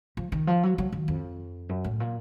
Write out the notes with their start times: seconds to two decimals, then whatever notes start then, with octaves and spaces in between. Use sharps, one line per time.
0.17 F3
0.32 D#3
0.47 F3
0.63 F#3
0.78 F#3
0.92 D#3
1.08 F2
1.69 F#2
1.84 A2
2.00 A#2